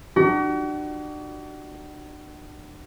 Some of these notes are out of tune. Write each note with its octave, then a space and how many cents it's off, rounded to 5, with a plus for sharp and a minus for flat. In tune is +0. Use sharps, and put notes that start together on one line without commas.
D4 +35 F#4 +40